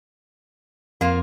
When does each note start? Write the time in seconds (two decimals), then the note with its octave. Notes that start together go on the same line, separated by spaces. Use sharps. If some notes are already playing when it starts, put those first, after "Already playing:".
1.01 F2 A#3 F4